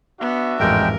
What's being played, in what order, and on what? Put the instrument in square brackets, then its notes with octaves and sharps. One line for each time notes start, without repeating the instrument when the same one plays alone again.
[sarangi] B3 [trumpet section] D4 F#4 E5
[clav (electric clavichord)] A1 F2 G#2 [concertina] G#3 G5 [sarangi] A#4